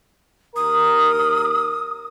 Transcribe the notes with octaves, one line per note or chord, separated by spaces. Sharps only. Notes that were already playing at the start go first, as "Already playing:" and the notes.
D#2 A#4 D#6